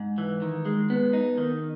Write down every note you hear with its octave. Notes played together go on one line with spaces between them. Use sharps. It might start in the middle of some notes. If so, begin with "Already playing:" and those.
Already playing: G#2
E3
D#3
G#3
B3
D#4
D#3